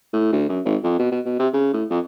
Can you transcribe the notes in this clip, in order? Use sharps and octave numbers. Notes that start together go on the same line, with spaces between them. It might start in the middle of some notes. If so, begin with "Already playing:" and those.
A2
D2
F#2
G#1
F2
B2
B2
B2
C3
C#3
A2
F2